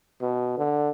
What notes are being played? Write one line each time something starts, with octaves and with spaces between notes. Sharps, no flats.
B2
D3